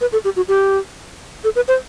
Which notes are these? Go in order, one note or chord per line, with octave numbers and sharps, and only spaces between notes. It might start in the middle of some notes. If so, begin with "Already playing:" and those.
B4
A4
G4
F#4
G4
A4
B4
C5